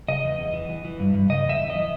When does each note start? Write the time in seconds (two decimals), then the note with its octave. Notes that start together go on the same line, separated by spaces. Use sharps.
0.08 C#3 D#5
0.24 E2
0.39 E2
0.53 E3
0.70 E3
0.85 E3
1.00 G2
1.14 G2
1.29 C#3 D#5
1.45 E2 E5
1.60 E2
1.70 D#5
1.75 E3